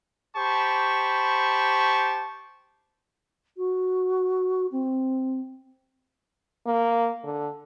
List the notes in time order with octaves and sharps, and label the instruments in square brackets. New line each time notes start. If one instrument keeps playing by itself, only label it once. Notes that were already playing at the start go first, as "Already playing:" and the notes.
[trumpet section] G4 C5 A5 B5 C#6
[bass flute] F#4
C4
[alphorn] A#3
D3